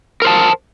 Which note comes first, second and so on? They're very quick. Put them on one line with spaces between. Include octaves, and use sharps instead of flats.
A#4 C5 A5